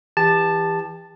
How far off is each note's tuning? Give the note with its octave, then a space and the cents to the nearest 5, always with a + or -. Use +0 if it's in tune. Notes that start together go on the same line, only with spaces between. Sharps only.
E3 +0 G4 +35 A5 +0